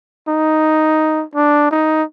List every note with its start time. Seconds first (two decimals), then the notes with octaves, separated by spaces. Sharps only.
0.28 D#4
1.35 D4
1.71 D#4